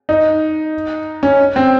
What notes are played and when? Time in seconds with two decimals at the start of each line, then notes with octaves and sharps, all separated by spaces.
0.09 D#4
1.23 C#4
1.56 C4